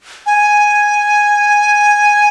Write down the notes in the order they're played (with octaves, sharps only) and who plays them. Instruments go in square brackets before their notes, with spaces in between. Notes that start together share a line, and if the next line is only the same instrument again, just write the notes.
[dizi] G#5